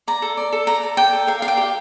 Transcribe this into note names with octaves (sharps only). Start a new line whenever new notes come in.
D5 A#5
A4
D5
A4
D5 A#5
A4
D5 G5
A4
A#4 F5
D5 F5
G5
G4